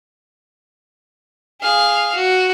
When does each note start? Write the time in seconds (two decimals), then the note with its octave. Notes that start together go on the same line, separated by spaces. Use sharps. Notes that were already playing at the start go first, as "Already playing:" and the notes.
1.61 G#4 F5
2.15 F#4